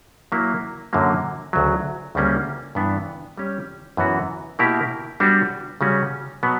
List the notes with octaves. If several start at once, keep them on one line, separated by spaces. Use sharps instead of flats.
F#3 A#3 E4
F#2 D3 F#3 A#3
D2 C#3 F#3
D2 C#3 G3 A#3 C#4
G2 E3 B3 D4
G3 C#4 G4
F#2 E3 B3 F#4
B2 A#3 E4 G4 A#4
G3 B3 D4 F#4
C#3 G3 C#4 F#4
B2 F#3 B3